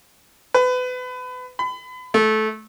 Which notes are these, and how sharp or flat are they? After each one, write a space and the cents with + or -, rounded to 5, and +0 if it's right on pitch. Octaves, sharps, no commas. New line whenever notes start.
B4 +30
B5 +35
A3 -20